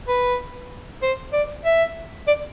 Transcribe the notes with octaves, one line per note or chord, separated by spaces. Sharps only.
B4
C5
D5
E5
D5